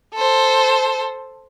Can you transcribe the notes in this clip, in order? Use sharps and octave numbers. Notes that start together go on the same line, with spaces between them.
A4 C5